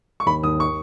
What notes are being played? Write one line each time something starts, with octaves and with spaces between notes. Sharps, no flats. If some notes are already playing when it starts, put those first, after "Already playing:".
C#6
D#2 B5
D#2 D#6
C#6